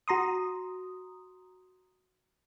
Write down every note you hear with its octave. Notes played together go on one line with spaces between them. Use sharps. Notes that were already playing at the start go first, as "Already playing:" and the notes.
F#4 A#5 C6 D#6